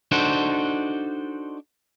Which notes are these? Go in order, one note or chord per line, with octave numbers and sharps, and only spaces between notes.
D4 D#4 F#4 A4 C5